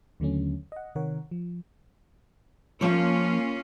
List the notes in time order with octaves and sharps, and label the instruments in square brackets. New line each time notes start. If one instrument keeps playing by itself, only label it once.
[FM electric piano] D#2 D3 F#3 A3 C#4
D#5 F#5
C3 D#3 A#4 C#5 F#5
F3
[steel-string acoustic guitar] F3 C#5 [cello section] A#3 C#4 F4